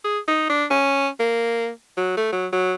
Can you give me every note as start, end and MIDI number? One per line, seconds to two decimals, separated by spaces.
0.05 0.19 68
0.28 0.46 63
0.49 0.65 62
0.70 1.08 61
1.20 1.69 58
1.97 2.16 54
2.17 2.32 57
2.32 2.47 54
2.53 2.74 54